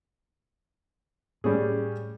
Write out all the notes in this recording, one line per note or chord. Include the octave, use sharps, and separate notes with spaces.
A2 G3 C#4 G#4